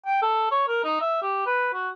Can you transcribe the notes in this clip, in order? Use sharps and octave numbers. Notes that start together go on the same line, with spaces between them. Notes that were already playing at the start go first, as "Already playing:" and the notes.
G5
A4
C#5
A#4
D#4
E5
G4
B4
F#4